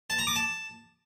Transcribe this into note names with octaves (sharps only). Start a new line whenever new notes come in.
A5
A#5
D6
A5